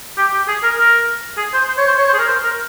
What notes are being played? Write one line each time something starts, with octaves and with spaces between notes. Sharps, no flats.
G4
G4
G#4
A#4
A#4
G#4
C5
C5
C#5
C5
C#5
C5
G#4
A#4
C5
A#4